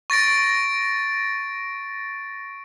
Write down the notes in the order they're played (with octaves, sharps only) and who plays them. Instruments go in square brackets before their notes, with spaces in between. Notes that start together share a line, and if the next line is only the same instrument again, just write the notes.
[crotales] C#6 A6 A#6 D7